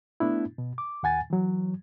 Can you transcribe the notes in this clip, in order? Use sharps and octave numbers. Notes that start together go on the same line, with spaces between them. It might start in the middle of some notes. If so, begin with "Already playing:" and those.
A3 B3 D4 E4
B2
D6
D#2 F#5 G#5 A6
E3 F#3